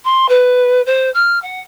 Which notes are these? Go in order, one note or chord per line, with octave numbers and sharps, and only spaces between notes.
C6
B4
C5
F6
F#5